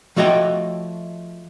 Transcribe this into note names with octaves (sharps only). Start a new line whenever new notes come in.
F3 A3 F#4 C#5 D#5 G5